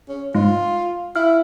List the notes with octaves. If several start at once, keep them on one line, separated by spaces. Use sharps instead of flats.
C#4
G#2 F4
E4 F5